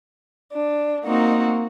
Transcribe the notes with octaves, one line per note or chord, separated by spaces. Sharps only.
D4
A#3 C4 D#4 F#4